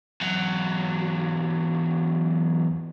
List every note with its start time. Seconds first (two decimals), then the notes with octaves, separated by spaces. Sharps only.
0.21 E2 F#3